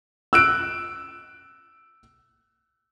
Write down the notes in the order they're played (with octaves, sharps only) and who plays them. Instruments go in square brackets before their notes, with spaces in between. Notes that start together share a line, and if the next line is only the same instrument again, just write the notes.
[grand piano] E6 F#6 D7